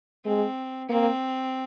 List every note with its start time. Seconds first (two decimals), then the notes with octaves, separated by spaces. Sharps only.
0.25 G#3 C4
0.89 A#3 C4